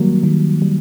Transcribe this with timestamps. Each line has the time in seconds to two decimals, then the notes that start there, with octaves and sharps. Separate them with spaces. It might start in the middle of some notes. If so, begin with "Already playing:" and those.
Already playing: D#3 F#3 G3 A#3
0.23 D#3
0.62 G3